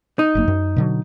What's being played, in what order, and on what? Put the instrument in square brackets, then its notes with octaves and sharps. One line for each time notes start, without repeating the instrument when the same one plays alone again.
[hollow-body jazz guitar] D#4
[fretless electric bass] F#1 F#2 A#3
F#2
B2 D3 F#3